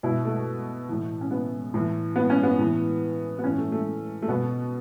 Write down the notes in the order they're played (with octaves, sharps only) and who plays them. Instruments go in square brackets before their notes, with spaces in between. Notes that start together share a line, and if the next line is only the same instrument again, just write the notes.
[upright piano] B2 E4
A3
A2 E3
C#4
B3
A2 E3
B3
C#4
B3
A2 E3
B3
A2 E3 C#4
A3
A3
A3
B2 B3